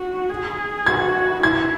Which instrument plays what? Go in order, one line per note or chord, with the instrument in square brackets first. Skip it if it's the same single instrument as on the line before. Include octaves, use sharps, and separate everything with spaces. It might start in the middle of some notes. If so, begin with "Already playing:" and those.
Already playing: [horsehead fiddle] F#4
G#4
[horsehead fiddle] F#4 [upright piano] G#6
[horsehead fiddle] E4 [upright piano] G#6